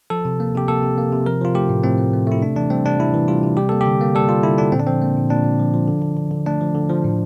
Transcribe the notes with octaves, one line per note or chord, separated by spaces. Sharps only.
F3 A4
C3
A#3
C3 G4
A#3 A4
C3
A#3
C3
F3 A#4
F3 F4
A3 G4
A2
A2 C4
A3
A3
A3 E4
C3 D4
E3 D4
G3 C4
C3 D4
C3 E4
E3
G3 F4
C3
G3 G4
A#3 A4
G4
D3
A#3
G3 A4
G3 F4
D3 E4
D3 D4
A#2 C4
D4
F3 C4
A#3
A#2
A#2 D4
A#2
F3
F3
D3
D3
D3
D3
A3 D4
F3
D3
F3
A2